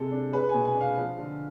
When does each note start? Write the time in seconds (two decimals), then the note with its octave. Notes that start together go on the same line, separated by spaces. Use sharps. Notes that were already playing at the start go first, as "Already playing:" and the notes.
Already playing: C3 G#3 A4
0.11 D4
0.32 G#3 B4
0.49 G#5
0.54 B2
0.65 G#5
0.75 D4
0.81 F5
0.97 F3
1.18 D3